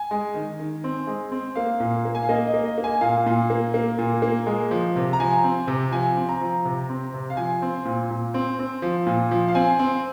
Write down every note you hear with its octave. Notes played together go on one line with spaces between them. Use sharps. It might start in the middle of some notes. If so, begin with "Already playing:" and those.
Already playing: G#5
G#3
D#3
D#3
C4
G#3
C4
A#3 F5
A#2
A#3
G#5
F5
A#3 D#5
D#5
A#3
D#5
A#3
G#5
A#2 F5
A#2
A#3
A#3
A#2
A#3
G#3
F3
C3
A#5
F3 G#5
C4
C3
F3 G#5
C4
A#5
F3
C3
C4
C3
F5
F3 G#5
C4
A#2
A#2
C4
C4
F3
A#2
F3
F5
C4 G#5
C4